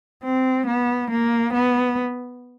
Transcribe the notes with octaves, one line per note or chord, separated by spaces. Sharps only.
C4
B3
A#3
B3